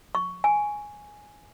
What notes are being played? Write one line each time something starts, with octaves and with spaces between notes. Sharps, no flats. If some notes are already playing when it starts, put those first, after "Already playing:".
C#6
G#5